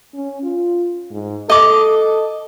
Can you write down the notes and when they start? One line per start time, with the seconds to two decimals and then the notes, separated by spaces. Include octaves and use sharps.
0.14 C#4
0.43 F4
1.11 G#2
1.50 A4 D#5 D6